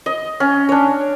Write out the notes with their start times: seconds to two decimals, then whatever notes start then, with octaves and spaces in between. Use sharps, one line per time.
0.06 D#5
0.40 C#4
0.69 D4 C#5